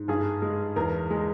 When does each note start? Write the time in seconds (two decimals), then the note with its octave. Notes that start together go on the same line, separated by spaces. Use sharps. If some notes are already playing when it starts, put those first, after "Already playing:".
Already playing: G#2
0.08 G2 G#4
0.42 G#3
0.76 E2 A#4
1.10 G#3